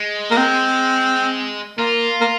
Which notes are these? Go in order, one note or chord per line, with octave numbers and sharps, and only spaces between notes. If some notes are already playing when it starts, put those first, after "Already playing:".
Already playing: G#3
A#3
C4
A#3 F4
A#3